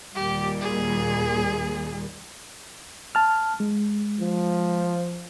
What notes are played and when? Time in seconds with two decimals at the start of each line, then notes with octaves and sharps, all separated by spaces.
0.15 D#2 A#2 G3 G4
0.61 G#4
3.15 A5 F6
3.60 G#3
4.20 F3